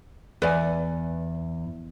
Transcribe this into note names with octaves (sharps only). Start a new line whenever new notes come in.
E2 B4 D5 G#5